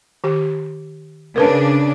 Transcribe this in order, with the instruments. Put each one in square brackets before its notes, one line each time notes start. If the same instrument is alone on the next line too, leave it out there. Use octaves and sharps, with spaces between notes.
[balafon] D#3 G4
[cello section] C#3 D4 [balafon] A#4 B4 A5